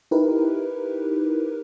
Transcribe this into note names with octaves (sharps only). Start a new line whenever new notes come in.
D#4 E4 G4 A#4 B4